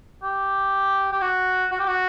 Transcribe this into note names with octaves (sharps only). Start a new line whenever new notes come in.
G4
G4
F#4
F#4
G4
F#4